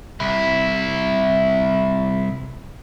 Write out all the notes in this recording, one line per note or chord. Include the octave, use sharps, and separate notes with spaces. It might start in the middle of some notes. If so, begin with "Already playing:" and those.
C2 E4